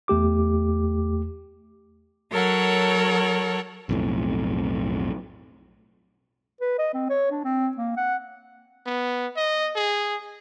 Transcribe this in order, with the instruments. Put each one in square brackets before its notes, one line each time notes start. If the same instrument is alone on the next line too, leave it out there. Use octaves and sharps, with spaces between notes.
[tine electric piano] E2 A3 G4 D6
[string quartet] F#3 A4 A#4 C#5 F#5
[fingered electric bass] B1 F2 A2
[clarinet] B4
D#5
C4
C#5
D4
C4
A#3
F#5
[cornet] B3
D#5
G#4